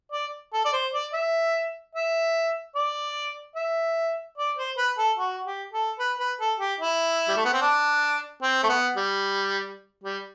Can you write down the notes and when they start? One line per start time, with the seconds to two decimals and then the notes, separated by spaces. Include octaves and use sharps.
0.12 D5
0.53 A4
0.65 D5
0.73 C5
0.93 D5
1.13 E5
1.95 E5
2.75 D5
3.56 E5
4.38 D5
4.57 C5
4.77 B4
4.98 A4
5.18 F#4
5.45 G4
5.73 A4
5.99 B4
6.19 B4
6.40 A4
6.59 G4
6.80 E4
7.28 G3
7.36 A3
7.45 B3
7.53 C4
7.61 D4
8.42 C4
8.63 A3
8.69 B3
8.97 G3
10.04 G3